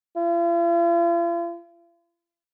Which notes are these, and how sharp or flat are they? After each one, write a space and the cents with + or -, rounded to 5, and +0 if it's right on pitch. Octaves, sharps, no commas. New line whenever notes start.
F4 -45